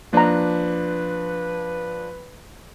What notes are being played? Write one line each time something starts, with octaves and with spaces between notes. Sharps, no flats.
F3 A#3 D4 B4 A#5